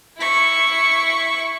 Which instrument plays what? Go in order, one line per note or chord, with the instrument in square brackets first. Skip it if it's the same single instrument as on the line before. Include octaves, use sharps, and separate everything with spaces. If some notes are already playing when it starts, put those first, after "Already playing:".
[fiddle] E4 C#6